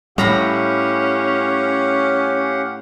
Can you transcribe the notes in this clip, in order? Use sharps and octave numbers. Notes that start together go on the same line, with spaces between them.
A2 G3 C#4 G4 F5 F#5 A#5 B5